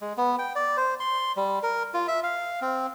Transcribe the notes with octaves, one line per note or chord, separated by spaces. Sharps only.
G#3
B3
G5
D5
C5
C6
G3
A#4
F4
E5
F5
C4